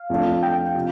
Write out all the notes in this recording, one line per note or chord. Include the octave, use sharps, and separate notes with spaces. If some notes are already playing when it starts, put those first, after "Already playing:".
Already playing: F5
F2 F3 A3 D4 F4
G5
C3 F3